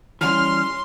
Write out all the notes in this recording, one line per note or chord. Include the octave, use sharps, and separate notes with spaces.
E3 G3 C#4 C6 F6